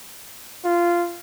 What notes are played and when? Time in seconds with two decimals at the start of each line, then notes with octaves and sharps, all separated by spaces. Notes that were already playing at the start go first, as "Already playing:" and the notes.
0.65 F4